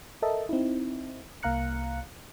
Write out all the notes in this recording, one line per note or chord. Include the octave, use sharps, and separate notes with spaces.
A4 A#4 D#5 E5 A5
C4 D#4 E4
C2 A#3 F5 A#5 F#6 C#7